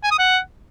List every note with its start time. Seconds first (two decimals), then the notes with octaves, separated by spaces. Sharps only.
0.04 G#5
0.11 D#6
0.19 F#5